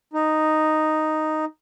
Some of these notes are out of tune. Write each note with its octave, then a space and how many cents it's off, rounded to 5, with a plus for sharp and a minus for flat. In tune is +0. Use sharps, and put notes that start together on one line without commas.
D#4 -5